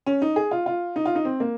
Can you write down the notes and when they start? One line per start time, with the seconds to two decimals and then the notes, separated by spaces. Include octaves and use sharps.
0.06 C#4
0.22 D#4
0.36 G#4
0.51 F4
0.66 F4
0.96 D#4
1.06 F4
1.15 D#4
1.25 C4
1.40 A#3